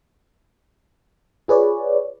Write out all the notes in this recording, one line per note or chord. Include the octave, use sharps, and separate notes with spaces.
F4 G#4 B4 C#5 D5